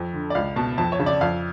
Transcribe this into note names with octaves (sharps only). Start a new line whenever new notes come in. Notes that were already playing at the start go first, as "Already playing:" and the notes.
Already playing: F2
D3
D5
C#2 F5
B2 A5
F2 A5
C#5
C#3
D5
F2 F5